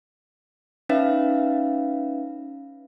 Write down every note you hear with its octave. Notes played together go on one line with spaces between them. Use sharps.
C#4 D#4 B4 E5 F5